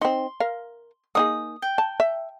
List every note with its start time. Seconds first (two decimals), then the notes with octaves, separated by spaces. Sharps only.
0.01 C4 D#4 C6
0.40 A#4 F5
1.15 A#3 D#4 G#4 D#6
1.62 G5
1.78 A5
2.00 E5